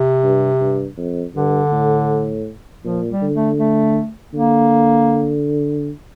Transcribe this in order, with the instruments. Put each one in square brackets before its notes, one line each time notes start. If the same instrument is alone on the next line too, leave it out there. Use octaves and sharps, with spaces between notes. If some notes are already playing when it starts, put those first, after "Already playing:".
Already playing: [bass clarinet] C3
[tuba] G2
G2
F2
[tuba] G2 [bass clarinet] D3
[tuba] A2
[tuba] A#2 [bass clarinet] F3
[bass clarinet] G3
[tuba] D3
[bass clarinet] A3
A3
[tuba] D3 [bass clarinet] A#3